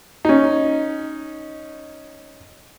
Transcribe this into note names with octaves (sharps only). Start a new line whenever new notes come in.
C#4 D#4